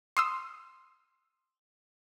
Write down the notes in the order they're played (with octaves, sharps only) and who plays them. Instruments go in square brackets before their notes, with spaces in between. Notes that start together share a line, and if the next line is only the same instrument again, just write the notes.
[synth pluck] C6 D#6 E6